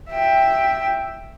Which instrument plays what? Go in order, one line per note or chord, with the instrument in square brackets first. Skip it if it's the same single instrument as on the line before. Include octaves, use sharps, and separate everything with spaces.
[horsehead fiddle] E5 G5